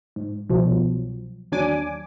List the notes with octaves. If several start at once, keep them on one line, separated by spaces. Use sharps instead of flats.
G#2
C2 B2 F3 F#3
D#2 F#3 D4 G#5 D6